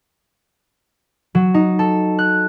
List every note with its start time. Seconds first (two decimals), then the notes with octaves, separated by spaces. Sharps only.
1.35 F#3
1.54 D#4
1.79 A4
2.19 F#6